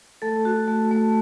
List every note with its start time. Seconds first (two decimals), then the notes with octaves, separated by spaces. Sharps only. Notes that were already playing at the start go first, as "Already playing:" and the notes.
0.22 A3 A4
0.45 F#4
0.68 A3
0.91 A3